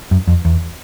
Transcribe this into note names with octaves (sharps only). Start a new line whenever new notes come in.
F#2
F2
E2